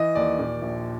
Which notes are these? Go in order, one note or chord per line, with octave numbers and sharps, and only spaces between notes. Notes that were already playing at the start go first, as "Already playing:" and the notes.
Already playing: E3 D#5
D#2 D5
A#2
A#1